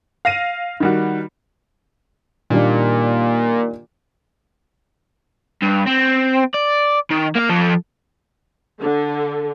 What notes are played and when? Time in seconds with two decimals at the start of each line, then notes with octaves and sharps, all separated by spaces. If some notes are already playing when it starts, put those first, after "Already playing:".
0.25 F5 A#6 D#7
0.80 D#3 G3 F#4
2.50 A#2 D#3 G3 D4
5.62 G2
5.87 C4
6.54 D5
7.10 D#3
7.36 A#3 F5
7.50 F3 A4
8.80 D3